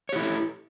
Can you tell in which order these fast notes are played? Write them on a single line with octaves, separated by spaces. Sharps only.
C#5 G4 E4 A4